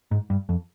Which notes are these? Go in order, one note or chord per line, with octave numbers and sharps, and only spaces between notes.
G#2
G2
F2